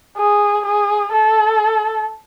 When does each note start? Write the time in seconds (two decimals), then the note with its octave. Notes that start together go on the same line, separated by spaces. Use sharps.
0.17 G#4
0.66 G#4
1.13 A4